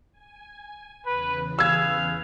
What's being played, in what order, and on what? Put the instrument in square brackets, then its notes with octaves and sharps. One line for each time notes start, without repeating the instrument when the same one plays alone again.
[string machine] G#5
[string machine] E2 C#3 E3 [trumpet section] B4
[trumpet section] G#4 B4 F5 [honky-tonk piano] E6 G#6